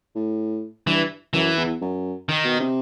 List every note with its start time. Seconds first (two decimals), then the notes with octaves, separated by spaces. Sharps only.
0.15 A2
0.86 G2 E3
1.34 F#2 E3
1.57 E2
1.81 F#2
2.29 D#3
2.44 B2
2.60 C3